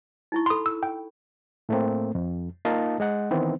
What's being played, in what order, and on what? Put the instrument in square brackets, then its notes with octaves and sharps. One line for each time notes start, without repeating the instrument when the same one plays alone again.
[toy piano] D#4 E4 C#6
[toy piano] A4 B5 [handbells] C6 D#6
[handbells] E6
G5
[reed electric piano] A2 A3 A#3 C4
F2
A#3 D#4 F4 D#5 F5 A5
G#3 D#5 F#5
D#3 E3 B3 C4